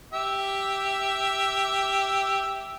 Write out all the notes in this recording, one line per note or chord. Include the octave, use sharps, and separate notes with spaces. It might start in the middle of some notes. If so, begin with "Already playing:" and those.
G4 E5